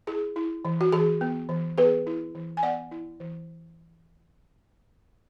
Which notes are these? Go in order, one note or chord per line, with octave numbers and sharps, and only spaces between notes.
E4 G#4
E4
E3
F#4
E3 G#4
B3
E3
B3 G#4 B4
E4
E3
G#5
B3 D5 F#5
E4
E3